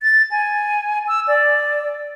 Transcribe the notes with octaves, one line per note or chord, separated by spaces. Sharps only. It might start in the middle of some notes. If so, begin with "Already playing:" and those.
A6
G#5
E6
D5